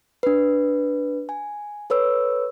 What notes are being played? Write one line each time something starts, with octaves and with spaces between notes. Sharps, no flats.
D4 B4
G#5
A4 B4 C#5 E6